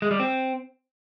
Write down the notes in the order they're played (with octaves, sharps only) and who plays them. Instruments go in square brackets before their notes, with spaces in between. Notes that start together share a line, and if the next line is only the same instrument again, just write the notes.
[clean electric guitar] G#3
G3
C4